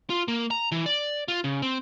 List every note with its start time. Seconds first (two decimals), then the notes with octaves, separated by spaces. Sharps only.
0.10 F4
0.28 A#3
0.51 A#5
0.72 E3
0.86 D5
1.28 F4
1.44 C#3
1.62 C4